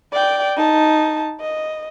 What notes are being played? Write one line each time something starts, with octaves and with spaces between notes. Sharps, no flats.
D5 G5
D#4 A5
D#5